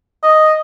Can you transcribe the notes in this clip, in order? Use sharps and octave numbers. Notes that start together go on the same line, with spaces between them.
D#5